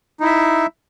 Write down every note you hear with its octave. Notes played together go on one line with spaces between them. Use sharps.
D#4 E4 E5